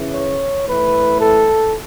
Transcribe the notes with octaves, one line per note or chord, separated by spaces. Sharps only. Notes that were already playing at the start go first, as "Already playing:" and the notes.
Already playing: C#3 E3
C#5
A2 E3 B4
A4